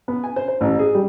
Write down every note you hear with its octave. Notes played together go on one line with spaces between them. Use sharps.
B3
G#5
C5
C5
A1
G#4
G3